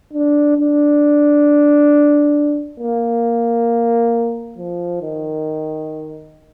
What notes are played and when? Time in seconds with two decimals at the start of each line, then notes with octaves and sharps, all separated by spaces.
0.13 D4
0.58 D4
2.80 A#3
4.58 F3
5.01 D#3